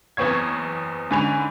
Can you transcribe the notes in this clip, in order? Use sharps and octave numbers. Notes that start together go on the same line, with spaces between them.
F#1 E2 B3 C4 C#5 G#6
G#2 D3 C#4 G#5 B5 F7